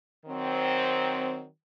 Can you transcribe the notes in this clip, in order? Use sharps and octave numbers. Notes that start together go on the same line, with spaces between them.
D#3 F#3 C4